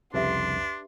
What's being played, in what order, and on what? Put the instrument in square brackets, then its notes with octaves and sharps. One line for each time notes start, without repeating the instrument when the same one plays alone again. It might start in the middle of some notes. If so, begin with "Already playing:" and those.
[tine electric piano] C2 F2 C#3 [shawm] D4 [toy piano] G4 B4 E5 [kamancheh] C6